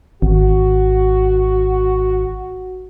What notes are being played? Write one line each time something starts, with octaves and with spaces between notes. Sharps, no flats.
G#1 F#4